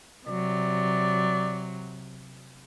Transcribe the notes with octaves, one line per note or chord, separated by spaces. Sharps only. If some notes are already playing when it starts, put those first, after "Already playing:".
C3 F#3 D5